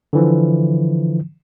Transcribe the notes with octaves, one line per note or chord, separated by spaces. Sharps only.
D3 E3 F3